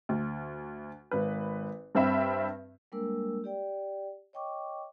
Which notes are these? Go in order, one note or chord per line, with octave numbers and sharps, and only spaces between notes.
D2
G#1 B4
G2 C4 E5 B5
G3 G#3 A#3 D4 A#4 E6
G4 D5 G5
C#5 D#5 G5 C#6 D6